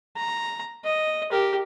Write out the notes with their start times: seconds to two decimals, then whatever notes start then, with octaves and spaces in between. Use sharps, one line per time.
0.16 A#5
0.84 D#5
1.32 G4 A#4